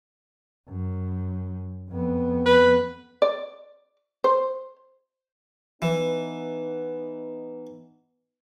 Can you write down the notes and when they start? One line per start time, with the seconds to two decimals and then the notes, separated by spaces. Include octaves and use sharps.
0.68 F#2
1.90 F2 B3
2.46 B4
3.22 D5
4.24 C5
5.82 E3 B3 D#4